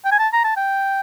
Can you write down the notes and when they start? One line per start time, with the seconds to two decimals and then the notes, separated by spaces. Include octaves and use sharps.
0.05 G5
0.12 G#5
0.19 A5
0.33 A#5
0.44 A5
0.57 G5